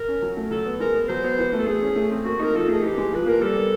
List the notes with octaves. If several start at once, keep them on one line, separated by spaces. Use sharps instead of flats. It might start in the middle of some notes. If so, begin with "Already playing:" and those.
Already playing: A#4
C#4
F#3
A3
F#3 A4
B3
G#3 A#4
B3
F#3 C5
B3
E3
A3
A4
A3 G#4
C#4
A3
C4
A#3 F#4
D#4 A#4
F3 A4
A3 G#4
E3 G4
G#3
F3 B4
A#3 A#4
G3 A4
B3